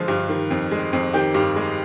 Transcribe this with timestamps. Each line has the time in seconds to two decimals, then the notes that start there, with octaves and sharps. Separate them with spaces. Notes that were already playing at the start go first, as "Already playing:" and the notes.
Already playing: D3 F3 G#3 F4
0.08 G2
0.29 D#3
0.51 F2
0.71 G#3
0.93 F2
1.13 D#3 G4 G5
1.34 G2
1.56 G#3